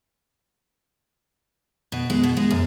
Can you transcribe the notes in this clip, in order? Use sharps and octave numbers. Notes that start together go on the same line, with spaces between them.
B2
G#3
B2
G#3
F#2